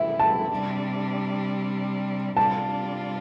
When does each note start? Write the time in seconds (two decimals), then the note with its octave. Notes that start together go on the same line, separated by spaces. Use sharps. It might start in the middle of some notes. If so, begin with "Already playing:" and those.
Already playing: C3 E3 B3 E4 E5
0.19 A5
0.51 C3 G3 D4
2.37 C3 G3 D4 F4 A5